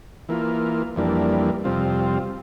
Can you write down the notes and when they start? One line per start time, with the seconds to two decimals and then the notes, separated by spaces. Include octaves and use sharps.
0.29 E3 A#3 F4
0.96 F2 E3 G3 A#3 D4
1.64 F2 C3 G3 C4 F4